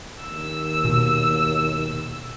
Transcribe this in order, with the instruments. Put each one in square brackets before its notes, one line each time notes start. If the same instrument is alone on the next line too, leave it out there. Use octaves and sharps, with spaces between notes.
[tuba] D#2 [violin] E6
[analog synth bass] B2